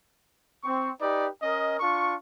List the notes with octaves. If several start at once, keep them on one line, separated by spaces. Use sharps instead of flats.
C4 C#6
D#4 G4 B4 D5
C#4 A#4 D#5
D4 F4 C#6